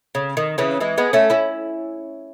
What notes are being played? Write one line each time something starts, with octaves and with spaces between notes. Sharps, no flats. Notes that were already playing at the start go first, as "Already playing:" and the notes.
C#3
D#3
C#3 E3
E3 G#3
G#3 B3
A3 C#4
C#4 E4